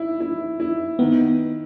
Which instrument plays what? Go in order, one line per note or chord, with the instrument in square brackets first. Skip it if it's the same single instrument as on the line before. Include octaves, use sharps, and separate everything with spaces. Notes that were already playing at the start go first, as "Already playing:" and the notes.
Already playing: [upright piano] E4
E4
E4
[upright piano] D#3 [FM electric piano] B3